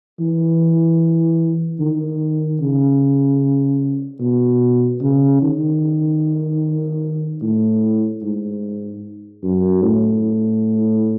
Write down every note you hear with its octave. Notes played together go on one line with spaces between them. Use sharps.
E3
D#3
C#3
B2
C#3
D#3
A2
G#2
F#2
A2